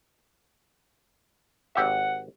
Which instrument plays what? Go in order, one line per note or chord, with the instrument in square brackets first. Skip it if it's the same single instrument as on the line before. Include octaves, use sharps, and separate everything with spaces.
[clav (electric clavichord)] G#1 G4 E5 [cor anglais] F#5